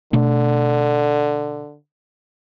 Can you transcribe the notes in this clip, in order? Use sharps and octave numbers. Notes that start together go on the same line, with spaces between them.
B2 D3 A3 D4